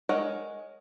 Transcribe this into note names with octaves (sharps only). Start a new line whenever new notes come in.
G#3 A#4 C#5 D#5 F#5